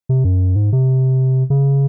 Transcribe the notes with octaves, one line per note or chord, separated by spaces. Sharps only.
C3
F#2
G#2
C3
C#3